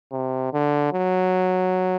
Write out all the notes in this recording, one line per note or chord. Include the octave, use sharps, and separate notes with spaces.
C3
D3
F#3